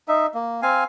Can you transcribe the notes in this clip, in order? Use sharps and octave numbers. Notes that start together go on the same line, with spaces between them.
D#4 E5
A#3
C4 F5 G#5